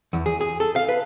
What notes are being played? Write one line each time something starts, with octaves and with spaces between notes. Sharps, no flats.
E2
G#4
G#4
A4
F5
B4